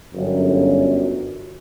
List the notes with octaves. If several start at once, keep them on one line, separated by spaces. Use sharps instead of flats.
G1 F#2